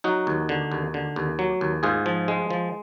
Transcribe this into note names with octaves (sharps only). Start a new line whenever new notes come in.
F#3 D#4 F#4
D#2
D3
D#2
D3
D#2
F#3
D#2
G#2 F4 G#4
F3
G#3
F3